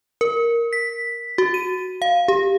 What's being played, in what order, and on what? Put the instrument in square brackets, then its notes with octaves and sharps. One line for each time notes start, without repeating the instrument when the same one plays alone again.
[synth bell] A#4
B6
F#4
D#7
F5
G4